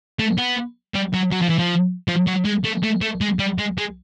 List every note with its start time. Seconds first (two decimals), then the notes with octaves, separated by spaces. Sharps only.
0.19 A3
0.38 B3
0.95 G3
1.14 F#3
1.32 F#3
1.42 F3
1.49 E3
1.59 F3
2.08 F3
2.27 F#3
2.45 G#3
2.64 A3
2.83 A3
3.01 A3
3.21 G#3
3.39 G3
3.59 G#3
3.78 G#3